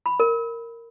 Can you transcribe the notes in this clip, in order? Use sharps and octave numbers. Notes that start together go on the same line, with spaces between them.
B5
A#4